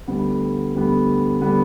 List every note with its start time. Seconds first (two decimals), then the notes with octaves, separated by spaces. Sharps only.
0.07 D2 D3 G3 B3
0.75 D2 D3 G3 B3
1.41 D3 G3 B3